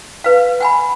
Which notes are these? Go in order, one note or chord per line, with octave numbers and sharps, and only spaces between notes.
B4 F5
F#5 G#5 B5